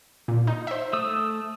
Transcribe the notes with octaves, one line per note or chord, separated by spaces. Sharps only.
A#2
D#4
C5 E5
A3 D#6 E6